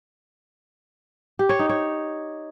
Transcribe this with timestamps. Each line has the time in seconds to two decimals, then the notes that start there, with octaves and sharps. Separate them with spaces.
1.39 G4
1.49 C#5
1.59 D#4
1.69 C#5